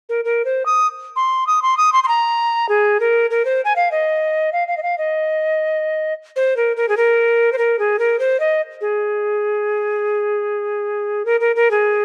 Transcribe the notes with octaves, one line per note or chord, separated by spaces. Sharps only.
A#4
A#4
C5
D#6
C6
D#6
C6
D#6
C6
C6
A#5
G#4
A#4
A#4
C5
G#5
F5
D#5
F5
F5
D#5
F5
D#5
C5
A#4
A#4
G#4
A#4
C5
A#4
G#4
A#4
C5
D#5
G#4
A#4
A#4
A#4
G#4